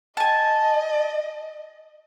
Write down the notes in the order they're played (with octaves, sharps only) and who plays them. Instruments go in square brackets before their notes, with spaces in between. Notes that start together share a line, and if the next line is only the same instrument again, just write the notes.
[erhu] D#5 [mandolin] G#5 A5